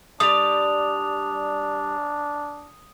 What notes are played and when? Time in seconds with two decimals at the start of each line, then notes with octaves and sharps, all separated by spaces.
0.20 G3 D4 D5 D#6 F7